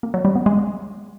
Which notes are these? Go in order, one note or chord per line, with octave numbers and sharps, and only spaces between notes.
A#3
F#3
G3
B3
G#3